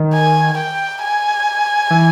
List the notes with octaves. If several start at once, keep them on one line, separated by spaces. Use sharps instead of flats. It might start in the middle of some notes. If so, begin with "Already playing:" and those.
Already playing: D#3
G#5
G5
G#5
E3